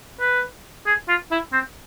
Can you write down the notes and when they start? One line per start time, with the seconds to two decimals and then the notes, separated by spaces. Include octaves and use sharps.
0.21 B4
0.86 G#4
1.08 F4
1.31 E4
1.53 C4